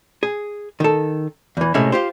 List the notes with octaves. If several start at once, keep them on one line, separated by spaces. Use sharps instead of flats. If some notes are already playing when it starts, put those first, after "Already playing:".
G#4
D#3 A4
E2 E3
A2 C3 G#3 C#4 E5
F4 G4 C5